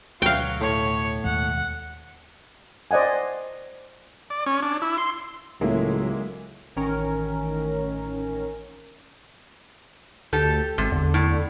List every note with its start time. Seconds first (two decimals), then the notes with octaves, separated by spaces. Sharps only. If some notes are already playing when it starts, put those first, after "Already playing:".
0.22 D2 B2 F#3 F5 G5
0.61 A2 C#5
1.24 D#2 B2 G#3 F#5
2.91 C5 D5 D#5 F#5 G#5
4.30 D5
4.46 C#4
4.63 D4
4.82 E4
4.98 C6
5.61 C#2 A2 F#3 G#3 A#3 E4
6.76 A1 D#3 C#4 A#4
10.33 D2 G4 A4
10.78 G#1 C3
10.92 E2 D3
11.14 A2